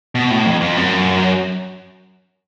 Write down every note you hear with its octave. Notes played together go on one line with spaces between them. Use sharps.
B2
A2
F2
F2
F#2